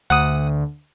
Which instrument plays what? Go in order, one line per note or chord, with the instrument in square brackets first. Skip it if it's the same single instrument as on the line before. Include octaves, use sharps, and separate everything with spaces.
[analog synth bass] D2 [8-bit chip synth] F#5 D#6